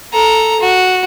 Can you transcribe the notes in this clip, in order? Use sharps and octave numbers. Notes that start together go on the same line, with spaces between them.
A4 A#5
F#4